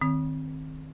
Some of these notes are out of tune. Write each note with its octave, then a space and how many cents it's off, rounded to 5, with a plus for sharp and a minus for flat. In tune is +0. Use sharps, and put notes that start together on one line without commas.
D#3 -20 C4 +0